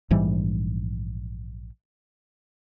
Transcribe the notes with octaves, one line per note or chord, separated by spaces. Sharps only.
A#1 G#2 E3 G3